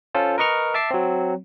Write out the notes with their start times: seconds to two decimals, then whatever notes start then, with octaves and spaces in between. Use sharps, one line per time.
0.15 C#4 F4 A4 C5
0.38 A#4 B4 D#5 C#6 F6
0.74 E5 A5 D6 C7
0.91 F#3 C4